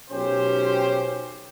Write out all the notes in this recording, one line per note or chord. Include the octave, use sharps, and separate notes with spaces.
B1 C#4 G4 C5